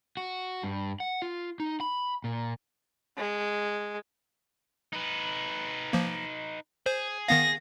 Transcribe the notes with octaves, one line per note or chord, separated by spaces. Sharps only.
F#4
G2
F#5
F4
D#4
B5
A#2
G#3
D#4 B4
F3 A#3
G#4 C5
D#3 B3 F5 A#6